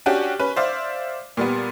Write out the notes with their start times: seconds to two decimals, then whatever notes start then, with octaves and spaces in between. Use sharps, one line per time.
0.06 C#4 D4 F#4 G4
0.39 C#4 B4
0.56 C5 D5 E5 F5
1.37 A#2 G3 B3